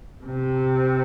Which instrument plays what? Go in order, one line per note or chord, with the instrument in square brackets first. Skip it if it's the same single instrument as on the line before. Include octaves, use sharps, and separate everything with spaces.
[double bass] C3